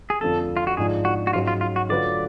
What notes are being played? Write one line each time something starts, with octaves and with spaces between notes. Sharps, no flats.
G#4
F2 D3 F3 A3 A4
F4
F#4
G#2 F3 G#3 D4 F4 G#4
F#4
F#4
G#2 F#3 C#4 F4
F4
F4
F#4
D3 F#3 A3 F4 B4 D5